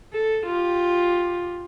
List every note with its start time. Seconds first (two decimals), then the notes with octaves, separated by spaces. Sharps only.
0.13 A4
0.46 F4 G4